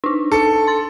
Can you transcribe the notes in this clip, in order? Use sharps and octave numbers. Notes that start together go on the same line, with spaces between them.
D4 D#4
A4 C#7
C6 A6